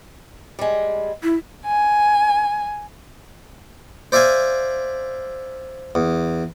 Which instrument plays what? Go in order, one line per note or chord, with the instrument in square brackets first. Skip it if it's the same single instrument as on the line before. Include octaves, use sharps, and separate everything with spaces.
[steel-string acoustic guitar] G3 G#3
[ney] E4
[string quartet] G#5
[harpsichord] C5 D5 E5 F5 G#5
E2